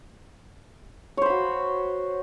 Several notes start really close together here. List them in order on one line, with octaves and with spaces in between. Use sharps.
C#5 C5 B5 F#4